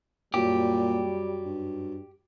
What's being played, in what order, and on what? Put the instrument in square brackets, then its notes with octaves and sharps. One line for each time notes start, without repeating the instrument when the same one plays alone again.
[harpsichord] F#2 [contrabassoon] A#2 [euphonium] G3 [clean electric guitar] G4
[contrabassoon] G2